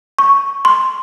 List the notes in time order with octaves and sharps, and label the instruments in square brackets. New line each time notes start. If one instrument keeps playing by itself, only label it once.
[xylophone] C#6
C6